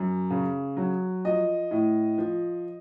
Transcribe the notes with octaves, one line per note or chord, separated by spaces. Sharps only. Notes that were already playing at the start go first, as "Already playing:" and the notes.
Already playing: F#2
C#3
F#3
F3 D#5
A2
F3